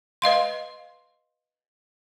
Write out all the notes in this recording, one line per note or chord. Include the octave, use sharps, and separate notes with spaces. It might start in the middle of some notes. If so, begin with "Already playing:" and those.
B4 D#5 F5 C6